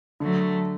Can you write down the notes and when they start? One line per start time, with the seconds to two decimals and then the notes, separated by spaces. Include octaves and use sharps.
0.20 D3 F#3 A3